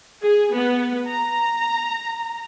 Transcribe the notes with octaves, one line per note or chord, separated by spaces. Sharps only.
G#4
B3
A#5